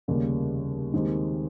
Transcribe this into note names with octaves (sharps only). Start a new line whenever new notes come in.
F1 D#2 C#3 G3 A#3
D#2 D#3 G#3 C4 G4